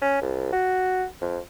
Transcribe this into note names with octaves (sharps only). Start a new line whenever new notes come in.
C#4
C2
F#4
F2